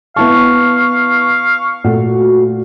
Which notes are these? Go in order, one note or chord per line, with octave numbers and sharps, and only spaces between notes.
B3 E4 F5 A5 C#6
A#2 A3 F#4